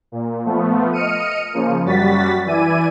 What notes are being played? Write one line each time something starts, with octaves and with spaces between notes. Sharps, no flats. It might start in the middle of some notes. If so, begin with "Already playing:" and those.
A#2
F3 A3 B3
D#5 F6 C#7 D#7
C#3 F3 A#3
F#2 G3 F#4 A6 B6
E3 E4 D5 G#5 D#7